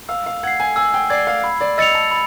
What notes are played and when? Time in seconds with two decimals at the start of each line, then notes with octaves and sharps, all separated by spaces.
0.09 F5 E6
0.26 F5
0.43 F#5 G#6 C7
0.60 G#5
0.76 G#5 E6
0.94 G5
1.10 D5 G#6 C7
1.27 F5
1.44 B5
1.61 D5
1.78 D#5 E6 A6 C#7 F7
1.95 A5
2.11 B5